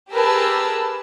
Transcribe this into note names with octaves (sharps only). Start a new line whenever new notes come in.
G4 G#4 A#4 B4 A5 E6